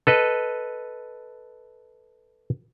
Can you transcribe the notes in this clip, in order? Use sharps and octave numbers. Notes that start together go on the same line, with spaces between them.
A4 B4 D#5